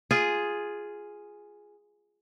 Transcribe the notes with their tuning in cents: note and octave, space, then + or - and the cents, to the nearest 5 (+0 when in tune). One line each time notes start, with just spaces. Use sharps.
F4 +0 G#4 +0